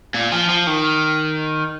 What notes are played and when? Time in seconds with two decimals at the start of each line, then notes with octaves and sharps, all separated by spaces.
0.14 A#2
0.32 F3
0.49 F3
0.67 D#3